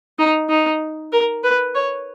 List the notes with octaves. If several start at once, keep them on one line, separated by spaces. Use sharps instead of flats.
D#4
D#4
A#4
B4
C#5